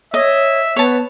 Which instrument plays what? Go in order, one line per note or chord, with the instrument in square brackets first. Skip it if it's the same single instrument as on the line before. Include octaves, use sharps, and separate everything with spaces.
[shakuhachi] C#5 [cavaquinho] D#5 [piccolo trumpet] E5
[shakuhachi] B3 [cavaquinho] C#5 A5